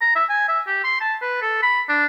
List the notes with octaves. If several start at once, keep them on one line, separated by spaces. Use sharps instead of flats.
A#5
E5
G#5
E5
G4
C6
A5
B4
A4
B5
D4